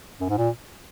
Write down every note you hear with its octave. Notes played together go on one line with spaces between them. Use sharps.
F#2
G#2
A#2